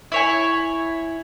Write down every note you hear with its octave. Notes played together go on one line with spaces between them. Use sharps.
E4 C#5 G#5